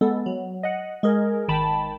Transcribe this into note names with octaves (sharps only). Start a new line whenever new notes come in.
G#3 B3 A4
F#3
D#5 F#5
G#3 G#4 A#4
G#1 D#3 G5 A5 B5